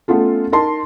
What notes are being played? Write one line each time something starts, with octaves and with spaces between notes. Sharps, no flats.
A3 B3 C#4 F4 A4
D#4 A#4 A5 C6